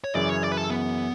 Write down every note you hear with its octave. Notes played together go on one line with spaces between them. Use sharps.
C#5
F#2 C#3 E3 D5
C#5
D5
B4
A4
B3